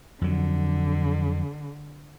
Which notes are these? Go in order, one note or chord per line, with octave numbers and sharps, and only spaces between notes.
F2 D3 F#3